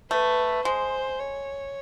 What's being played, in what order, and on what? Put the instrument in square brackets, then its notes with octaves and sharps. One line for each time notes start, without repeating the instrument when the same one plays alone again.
[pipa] A3 [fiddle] B4
[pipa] G#3 [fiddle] C5
[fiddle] C#5